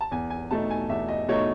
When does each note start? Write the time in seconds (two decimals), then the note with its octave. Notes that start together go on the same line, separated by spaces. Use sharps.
0.01 A5
0.11 E2 G#5
0.30 G#5
0.51 B2 A3 D#4 A5
0.71 G#5
0.89 E2 E5
1.09 D#5
1.28 B2 A3 D#4 C#5